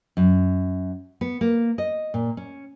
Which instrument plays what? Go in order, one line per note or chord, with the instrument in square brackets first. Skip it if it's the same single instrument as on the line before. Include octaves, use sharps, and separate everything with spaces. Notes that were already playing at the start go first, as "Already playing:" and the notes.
[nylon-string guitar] F#2
B3
A#3
D#5
A#2
C#4